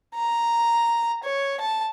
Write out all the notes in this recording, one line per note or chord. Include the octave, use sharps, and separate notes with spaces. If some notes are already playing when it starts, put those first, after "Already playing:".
A#5
C#5
A5